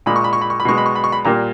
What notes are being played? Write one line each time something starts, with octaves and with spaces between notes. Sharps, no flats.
A#2 G#3 B5
C#6
B5
C#6
B5
C#6
B5
B2 G#3 C#6
B5
C#6
B5
C#6
B5
A#2 G3 A#3 A#5